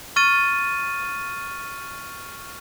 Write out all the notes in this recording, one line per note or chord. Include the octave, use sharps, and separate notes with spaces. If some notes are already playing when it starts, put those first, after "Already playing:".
C#6 F6 A6 D#7